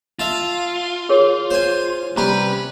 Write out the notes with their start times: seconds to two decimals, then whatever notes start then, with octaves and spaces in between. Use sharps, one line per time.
0.19 F4 E5 A5
1.09 G#4 A#4 C#5
1.50 C5 G#5
2.17 C3 G3 C#4 B4 A#5